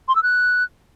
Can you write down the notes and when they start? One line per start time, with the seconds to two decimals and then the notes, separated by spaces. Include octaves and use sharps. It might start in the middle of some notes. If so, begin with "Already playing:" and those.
0.08 C6
0.16 E6
0.23 F#6